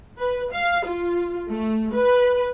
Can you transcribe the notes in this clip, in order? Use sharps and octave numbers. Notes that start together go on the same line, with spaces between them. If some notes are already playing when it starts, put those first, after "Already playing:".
B4
F5
F4
A3
B4